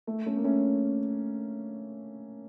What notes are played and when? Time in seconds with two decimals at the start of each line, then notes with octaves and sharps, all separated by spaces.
0.07 A3
0.26 A3 C#4
0.37 A#3
0.44 A3 C#4